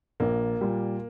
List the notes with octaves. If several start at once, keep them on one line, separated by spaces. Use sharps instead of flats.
A#1 A#3
A#2 G3